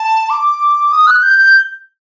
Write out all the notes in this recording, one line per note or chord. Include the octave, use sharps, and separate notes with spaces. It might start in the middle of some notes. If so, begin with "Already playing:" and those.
Already playing: A5
D6
D#6
F#6
G6
G6